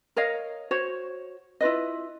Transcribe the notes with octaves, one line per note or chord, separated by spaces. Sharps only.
A#4 C#5 D#5 F5
F#4 C5 C#5
E4 F4 B4 D#5